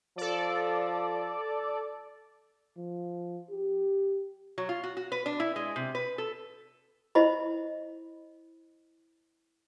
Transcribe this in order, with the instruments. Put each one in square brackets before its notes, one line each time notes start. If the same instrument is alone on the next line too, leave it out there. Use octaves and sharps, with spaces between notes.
[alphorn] F3 [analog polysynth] A4 D5
[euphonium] F3
G4
[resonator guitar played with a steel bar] F#3
F4
F#4
F#4
B4
D4
E4
G#3
C3
B4
A4
[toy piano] E4 C5 D#5 B5